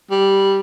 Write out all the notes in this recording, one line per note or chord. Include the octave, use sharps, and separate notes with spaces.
G3